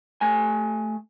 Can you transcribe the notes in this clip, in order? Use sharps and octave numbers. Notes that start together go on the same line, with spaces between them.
A3 G#5